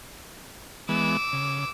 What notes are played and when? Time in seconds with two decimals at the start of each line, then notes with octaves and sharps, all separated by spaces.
0.89 E3 G#3 B3 D6 E6
1.33 C#3